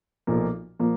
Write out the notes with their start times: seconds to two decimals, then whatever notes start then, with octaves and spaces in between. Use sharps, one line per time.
0.27 B1 A#2 F3 A#3
0.79 A#2 F3 A#3